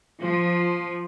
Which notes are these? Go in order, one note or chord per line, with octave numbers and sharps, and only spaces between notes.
F3